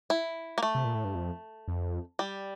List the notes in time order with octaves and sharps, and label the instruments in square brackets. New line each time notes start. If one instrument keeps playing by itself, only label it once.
[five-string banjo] E4
A#3
A3
[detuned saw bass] C3
A#2
A2
G2
F2
F2
[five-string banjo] G3